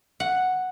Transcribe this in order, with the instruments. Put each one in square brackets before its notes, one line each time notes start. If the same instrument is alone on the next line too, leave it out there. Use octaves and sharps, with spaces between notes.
[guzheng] F#5